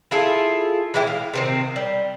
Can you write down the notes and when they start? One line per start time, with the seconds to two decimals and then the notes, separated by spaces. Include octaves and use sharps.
0.11 E4 F4 G#4 A4
0.94 E3 G#3 E4 G4
1.07 F5
1.34 C3 D#3 C4
1.76 G3